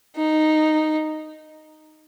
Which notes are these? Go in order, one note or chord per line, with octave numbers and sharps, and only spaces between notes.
D#4